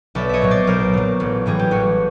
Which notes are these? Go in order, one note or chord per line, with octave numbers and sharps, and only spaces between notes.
B1 D5 E5
C#5 D#5 E5
A#2 F#3
C5 D5
B1 A#4 C5
A#2 F#3
A1
A2 E3 G3 G#4
G4
A1 F#4